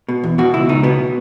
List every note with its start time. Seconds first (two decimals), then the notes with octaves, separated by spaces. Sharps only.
0.08 B2
0.24 E2
0.38 B2 F#4
0.54 C#2 E4
0.69 C#2 D#4
0.83 B2 B3